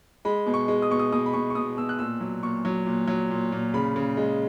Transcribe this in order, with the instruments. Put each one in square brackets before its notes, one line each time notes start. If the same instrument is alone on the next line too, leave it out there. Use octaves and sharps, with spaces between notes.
[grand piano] G#3 B5
B2
C#6
G#3
D#6
B2 C#6
D#6
B2 D#6
B5
B2 C#6
C#6
B2 D#6
B2 E6
F#6
A#2 E6
F#3
A#2 C#6
F#3
A#2
F#3
A#2
A#2
C#3 B5
C#3
G#3